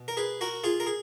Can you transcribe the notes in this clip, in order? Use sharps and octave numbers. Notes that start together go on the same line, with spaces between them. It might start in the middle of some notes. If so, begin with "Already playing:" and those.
Already playing: B2
A#4
G#4 B4
F#4 A#4
F4 G#4
A#4
G#4